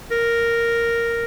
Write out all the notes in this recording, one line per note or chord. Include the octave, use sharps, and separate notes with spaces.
A#4